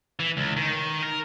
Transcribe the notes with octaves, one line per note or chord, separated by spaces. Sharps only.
E3
C#2
D#3
A#4